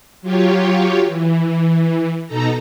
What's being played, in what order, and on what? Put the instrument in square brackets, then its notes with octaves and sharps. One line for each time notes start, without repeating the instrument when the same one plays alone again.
[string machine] F#3 F4 G4 C#5
E3
B2 D#4 A4 A#5